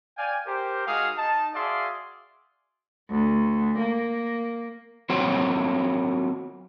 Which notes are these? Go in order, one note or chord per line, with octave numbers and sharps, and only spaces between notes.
D5 F5 G5 G#5
G4 A#4 C5
G#3 D#4 F#4 G#4 F5
D#4 A5
F#4 G#4 D5 E5 F5 C6
D2
A#3
F#3 C4 F4 F#4 C5 C#5